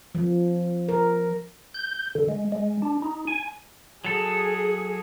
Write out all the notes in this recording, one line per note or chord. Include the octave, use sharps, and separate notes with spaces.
F3
A#4
G6
D3
G#3
G#3
D4
D#4
G#5
F#3 G#4 A4